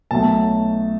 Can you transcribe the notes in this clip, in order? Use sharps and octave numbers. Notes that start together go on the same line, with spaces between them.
B1 B2 F#3 A3 A5